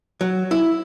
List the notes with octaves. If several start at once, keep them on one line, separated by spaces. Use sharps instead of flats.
F#3
E4